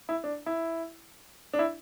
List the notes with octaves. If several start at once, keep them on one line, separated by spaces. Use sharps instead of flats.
E4
D4
E4
D4
E4